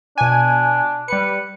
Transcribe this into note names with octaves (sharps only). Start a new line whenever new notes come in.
B2 D4 G#5
G3 B4 C#7